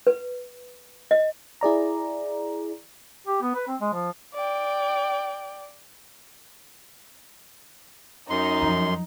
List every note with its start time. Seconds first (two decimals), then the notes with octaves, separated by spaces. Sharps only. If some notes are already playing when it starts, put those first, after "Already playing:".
0.07 B4
1.11 D#5
1.61 E4 G#4 D5 A#5
3.27 G4
3.42 B3
3.55 B4
3.67 C4
3.81 G#3
3.93 F3
4.34 D5 G5
8.30 F#2 D#4 C6
8.62 F2 F#3